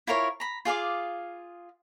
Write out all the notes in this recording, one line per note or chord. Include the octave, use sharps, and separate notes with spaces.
E4 F4 A#4 C#5
A#5 B5
F4 G#4 F5 D6